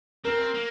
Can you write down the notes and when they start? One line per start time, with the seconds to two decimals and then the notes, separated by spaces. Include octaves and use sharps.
0.25 C4 A#4
0.54 A#3